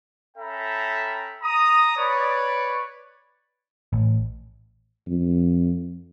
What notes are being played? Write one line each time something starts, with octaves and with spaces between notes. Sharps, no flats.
C#4 A4 E5 G5 A#5 B5
A#5 D#6
B4 C#5 D5
A1
F2